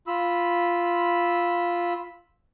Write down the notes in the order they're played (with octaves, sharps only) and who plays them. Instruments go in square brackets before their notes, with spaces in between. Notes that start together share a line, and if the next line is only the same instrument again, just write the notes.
[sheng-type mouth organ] F4 B5 E6